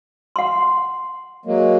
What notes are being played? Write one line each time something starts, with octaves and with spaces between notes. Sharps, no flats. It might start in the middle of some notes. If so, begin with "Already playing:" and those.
F#5 C6
F#3 G#3 A#3